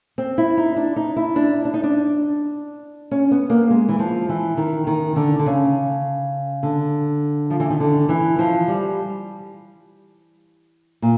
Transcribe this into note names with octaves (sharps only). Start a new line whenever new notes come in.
C4
E4
D#4
D4
D#4
E4
D4
D4
D#4
D4
C#4
B3
A#3
G#3
E3
F3
E3
D#3
D#3
D3
D3
C#3
D3
F3
E3
D#3
D3
E3
F3
G3
A#2